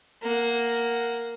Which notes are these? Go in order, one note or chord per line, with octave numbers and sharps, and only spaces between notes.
A#3 F#5